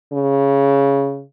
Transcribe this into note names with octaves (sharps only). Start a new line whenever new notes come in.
C#3